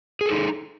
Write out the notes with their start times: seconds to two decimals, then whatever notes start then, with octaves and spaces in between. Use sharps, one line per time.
0.21 G#4
0.26 A4
0.31 D#4